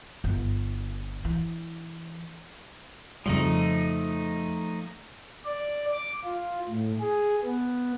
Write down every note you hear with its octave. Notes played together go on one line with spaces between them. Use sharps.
G1
E3
F2 C#3 F3 G3 A3 D#4
D5
D6
F4
A2
G#4
B3